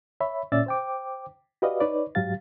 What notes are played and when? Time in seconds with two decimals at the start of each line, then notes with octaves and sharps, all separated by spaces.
0.20 C#5 E5 B5
0.52 A#2 C#4 D5 E5 E6 A6
0.66 C5 G5 D6
1.62 F#4 G4 B4 D5 D#5 F5
1.80 D#4 B4 C#5 D5
2.15 G#2 F#3 G4 F5 A6